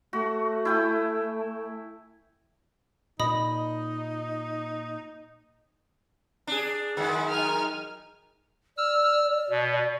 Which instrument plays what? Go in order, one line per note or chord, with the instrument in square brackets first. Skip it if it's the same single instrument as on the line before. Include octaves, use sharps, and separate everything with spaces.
[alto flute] A3 [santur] F#4
[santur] E4 G5 G#5
[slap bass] A#2 [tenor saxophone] D#4 [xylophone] D#5 B5 D#6
[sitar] D4 G#4
[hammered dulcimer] F#2 [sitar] D#3 G#3 [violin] E4 F#5
[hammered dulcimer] D#4 A#4 [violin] G#5 F6
[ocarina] D5 [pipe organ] E6 F6
[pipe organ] B2